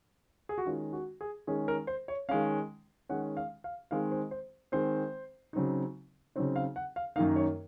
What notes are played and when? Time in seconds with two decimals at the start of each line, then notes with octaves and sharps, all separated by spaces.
0.49 G#4
0.58 F#4
0.66 D#3 G#3 C#4 F4
0.93 F#4
1.21 G#4
1.47 D#3 G#3 C#4 G#4
1.68 A#4
1.87 C5
2.08 C#5
2.29 D#3 G#3 C#4 F5
3.09 D#3 G#3 C#4 F#5
3.37 F5
3.64 F5
3.91 D#3 G#3 C4 F5
4.12 C5
4.31 C5
4.72 D#3 G#3 C4 C5
5.53 C#3 F#3 C4 D#4
6.36 C#3 F#3 C4 D#4 C#5
6.56 F5
6.76 F#5
6.96 F5
7.16 F#2 D#3 A#3 D#4 F5
7.36 C#5